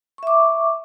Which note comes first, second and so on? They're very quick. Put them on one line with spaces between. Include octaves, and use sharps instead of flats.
C#6 E5 D6